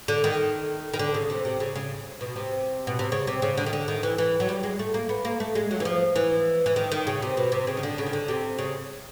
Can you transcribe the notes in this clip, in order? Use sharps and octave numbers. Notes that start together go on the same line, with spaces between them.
D3
D#3
D#3
D3
C#3
C3
C3
C#3
C#3
B2
C3
B2
C3
C#3
C3
C#3
D3
D#3
D3
D#3
E3
E3
F#3
G3
G#3
A3
A#3
B3
A#3
A3
G#3
F#3
E3
F3
E3
E3
D#3
D#3
C#3
C3
B2
C3
C#3
D#3
D3
C#3
D#3
D3
C3
C#3